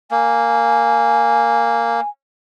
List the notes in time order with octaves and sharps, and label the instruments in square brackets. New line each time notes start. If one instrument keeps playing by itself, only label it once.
[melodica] A#3 [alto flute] G#5